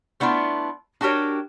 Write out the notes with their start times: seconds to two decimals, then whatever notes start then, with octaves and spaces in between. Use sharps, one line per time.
0.20 A3 B3 D4 E4 F4
1.01 D4 F#4 G4 A#4 C#5